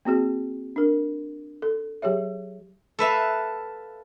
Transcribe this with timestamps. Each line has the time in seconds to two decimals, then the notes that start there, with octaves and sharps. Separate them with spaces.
0.05 A#3 C4 F#4 G#4
0.76 D4 A#4
1.62 A4
2.02 F#3 G4 G#4 C#5 E5
2.99 A4 B4 E5 F5